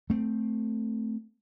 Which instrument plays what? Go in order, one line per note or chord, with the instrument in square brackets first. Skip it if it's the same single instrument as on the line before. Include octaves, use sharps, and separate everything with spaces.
[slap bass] A3 C4